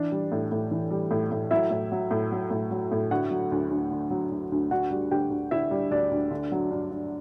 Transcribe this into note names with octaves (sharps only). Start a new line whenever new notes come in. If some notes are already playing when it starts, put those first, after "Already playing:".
Already playing: E3 D4 D5
G3
A2
A2
E3
G3
A2
A2
F#3 E4 E5
A2
F#3
A2
F#3
A2
F#3
A2
D3 F#4 F#5
F#3
D2
D2
D3
F#3
D2
D2
D3 F#4 F#5
G3
D2 G4 G5
D2
D3 E4 E5
G3
D2 D4 D5
D2
D3
F#3
G2
G2